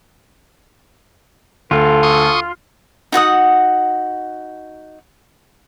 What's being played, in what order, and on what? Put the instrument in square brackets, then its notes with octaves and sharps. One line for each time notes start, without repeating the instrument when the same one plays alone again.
[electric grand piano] D2 [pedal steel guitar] F4 [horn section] A4
[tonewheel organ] C6 C#6 D#6
[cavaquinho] D#4 F#4 F#5 D#6